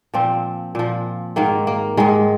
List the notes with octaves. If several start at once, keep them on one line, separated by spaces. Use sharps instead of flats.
A#2 F3 C4
A#2 F3
G#2 D#3 A#3
A#3
G#2 D#3 G#3